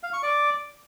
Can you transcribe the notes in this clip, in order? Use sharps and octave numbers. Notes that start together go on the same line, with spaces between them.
F5
C#6
D5